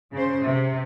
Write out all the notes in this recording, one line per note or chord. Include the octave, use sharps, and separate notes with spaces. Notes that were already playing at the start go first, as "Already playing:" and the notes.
C#3 C5
C3